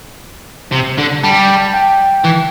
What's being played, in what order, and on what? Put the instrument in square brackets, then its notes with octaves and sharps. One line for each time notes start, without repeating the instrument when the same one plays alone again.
[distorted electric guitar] C3
D3
[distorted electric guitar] G3 [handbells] A5
[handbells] G5
[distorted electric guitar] E3